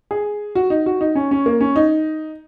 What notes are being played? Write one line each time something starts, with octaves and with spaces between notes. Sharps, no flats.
G#4
F#4
D#4
F#4
D#4
C#4
C#4
A#3
C#4
D#4